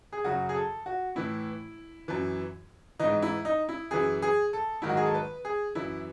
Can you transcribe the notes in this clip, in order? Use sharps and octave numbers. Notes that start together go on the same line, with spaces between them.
G#4
F#2 C#3 F#3 F#4
G#4
A4
F#4
A2 E3 E4
F#2 E3
G#2 E3 D#4
E4
D#4
E4
F#2 E3 G#4
G#4
A4
G#2 D#3 F#3 E4
F#4
G#4
A4
B4
G#4
F#2 E3 E4